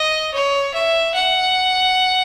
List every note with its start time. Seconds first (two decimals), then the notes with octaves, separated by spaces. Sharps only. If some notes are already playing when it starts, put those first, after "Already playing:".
Already playing: D#5
0.34 C#5
0.74 E5
1.14 F#5